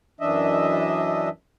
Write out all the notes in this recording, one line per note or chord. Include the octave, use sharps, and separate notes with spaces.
F#2 E3 D4 D#5 E5